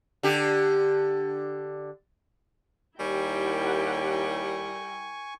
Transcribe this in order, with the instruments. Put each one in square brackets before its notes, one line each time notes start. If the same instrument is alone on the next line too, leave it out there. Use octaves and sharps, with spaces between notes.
[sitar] D3 G4
[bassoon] D#2 [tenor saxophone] G3 [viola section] E4 A#4 G5 [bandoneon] G#5 C#6